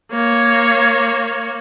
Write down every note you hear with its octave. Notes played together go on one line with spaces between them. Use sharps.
A#3 C#5